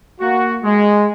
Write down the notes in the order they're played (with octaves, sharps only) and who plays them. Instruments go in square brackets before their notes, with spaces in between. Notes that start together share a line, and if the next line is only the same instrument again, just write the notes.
[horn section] A#3 F#4
G#3